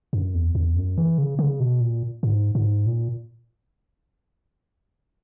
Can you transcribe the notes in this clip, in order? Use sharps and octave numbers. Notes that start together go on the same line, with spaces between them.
F#2
E2
E2
F#2
E3
C#3
C#3
B2
A#2
G#2
G#2
A#2